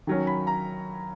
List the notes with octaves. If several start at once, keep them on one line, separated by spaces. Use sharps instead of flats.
D#3 F#3 C#4
B5
A#5